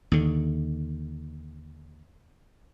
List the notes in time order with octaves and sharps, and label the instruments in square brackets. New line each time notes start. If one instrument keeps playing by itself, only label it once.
[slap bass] D#2 D3